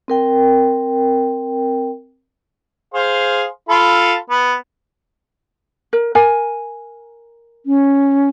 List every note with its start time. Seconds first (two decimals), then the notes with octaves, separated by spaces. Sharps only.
0.08 C4 A#4 G5
2.94 G#4 C5 F5
3.69 F4 A4 B5
4.30 B3
5.93 A#4
6.15 A#4 G#5
7.66 C#4